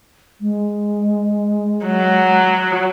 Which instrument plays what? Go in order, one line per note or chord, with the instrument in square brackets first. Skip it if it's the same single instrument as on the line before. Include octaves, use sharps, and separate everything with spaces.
[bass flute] G#3
[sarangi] F#3